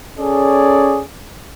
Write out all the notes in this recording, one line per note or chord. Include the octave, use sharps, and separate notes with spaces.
C#4 G#4 A4 C#5 D5